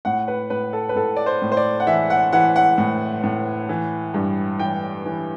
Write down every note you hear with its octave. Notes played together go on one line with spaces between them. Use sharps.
A2 F#5
B4
A2 B4
A4
B4
A2 A4
D5
C5
A2
C5
D5
F#5
E3 E5
F#5
E3 F#5
F#5
A2
A2
E3
G2
E3 G5
E3